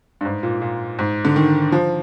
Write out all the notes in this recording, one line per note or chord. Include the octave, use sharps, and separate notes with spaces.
G2
G#2
A#2
A#2
G#2
D3
D#3
F3